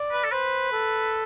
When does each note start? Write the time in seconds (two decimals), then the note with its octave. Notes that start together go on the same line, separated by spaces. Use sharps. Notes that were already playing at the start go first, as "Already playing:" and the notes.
Already playing: D5
0.12 B4
0.24 A4
0.32 B4 C5
0.72 A4